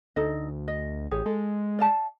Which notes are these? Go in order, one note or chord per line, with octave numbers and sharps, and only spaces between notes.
D2 D#4 A4 D#5
D#5
A1 G4 G#4 C#5
G#3 A4
D5 F5 A5